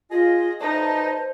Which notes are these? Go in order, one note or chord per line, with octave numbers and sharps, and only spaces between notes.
F4 G#4 D#5
D2 D#4 B4 C5 D#5 A5